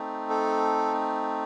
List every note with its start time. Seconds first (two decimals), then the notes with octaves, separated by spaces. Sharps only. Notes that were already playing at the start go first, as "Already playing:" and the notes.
Already playing: A3 C4 D#4
0.30 A4